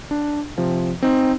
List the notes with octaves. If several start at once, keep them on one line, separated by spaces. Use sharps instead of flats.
D4
C3 F3
C4 D#4